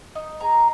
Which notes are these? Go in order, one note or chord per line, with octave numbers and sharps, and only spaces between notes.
D#4
G#4 A#5